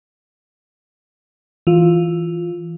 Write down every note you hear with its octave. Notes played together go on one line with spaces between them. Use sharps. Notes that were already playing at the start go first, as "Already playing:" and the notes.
E3 F4